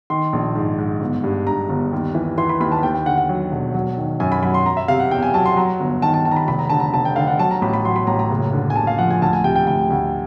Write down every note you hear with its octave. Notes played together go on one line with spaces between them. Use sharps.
D#3 C6
A#1
G#2
G#2
G1
G2
G2 A#5
G1
D#2
E3
E3 C6
B5
D#2 B5
A5
D#2 G5
G5
D3 F#5
F#5
F#3
E1
F#3
D#3
F#2 G#5
B5
F#3 B5
C6
F#3 A#5
E5
C3 F5
F#5
E2 G5
G#5
F#3 A5
C6
F#3 A#5
G1
D#3 A5
A5
D#3 A5
A#5
B5
F1 B5
A#5
D3 A5
A#5
F1 A5
G5
D3 F5
F#5
F#3 A5
A#5
A1 B5
B5
F#3 C6
B5
A1 A#5
A#5
F#1
D3
G#5
F#1 A5
F5
F3 F#5
G#5
D2 A5
G#5
C3 G5
G5
D2 G5
D2